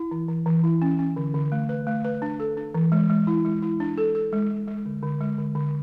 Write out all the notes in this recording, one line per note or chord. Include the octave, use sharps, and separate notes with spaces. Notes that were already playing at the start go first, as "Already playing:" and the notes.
Already playing: E4
E3
E3
E3
E4
C#4
C#4
D3
D3
A3
B4
A3
B4
D4
A4
D4
E3
G#3
G#3
E4
G#3
E4
D4
A4
A4
G#3
G#3
G#3
D3
D3
G#3
D3
D3